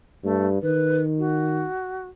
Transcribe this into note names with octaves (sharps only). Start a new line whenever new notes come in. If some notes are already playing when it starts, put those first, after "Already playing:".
G2 A3
D#3 B4
F#4